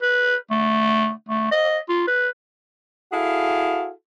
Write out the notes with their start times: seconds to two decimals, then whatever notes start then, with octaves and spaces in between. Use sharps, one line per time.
0.02 B4
0.51 A3
1.29 A3
1.51 D#5
1.89 F4
2.08 B4
3.12 E4 F#4 G#4 A4 F5